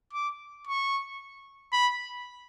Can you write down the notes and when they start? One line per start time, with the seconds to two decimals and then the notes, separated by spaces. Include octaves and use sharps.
0.13 D6
0.67 C#6
1.73 B5